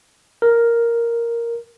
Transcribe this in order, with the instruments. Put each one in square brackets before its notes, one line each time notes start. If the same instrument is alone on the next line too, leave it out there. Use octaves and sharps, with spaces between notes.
[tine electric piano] A#4